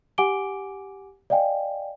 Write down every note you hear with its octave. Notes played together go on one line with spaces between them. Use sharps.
G4 F#5 G#5 D6 D7 G7
D5 D#5 F5 G5 G#5